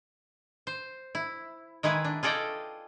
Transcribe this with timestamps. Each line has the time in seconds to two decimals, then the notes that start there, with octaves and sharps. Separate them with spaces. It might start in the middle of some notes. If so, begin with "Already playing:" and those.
0.67 C5
1.15 E4
1.83 D#3 G#3 E4 G#4 B4
2.04 D4
2.23 F4 G#4 A4 D5 D#5 G5